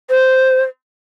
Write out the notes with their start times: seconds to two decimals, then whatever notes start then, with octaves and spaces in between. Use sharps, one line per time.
0.09 C5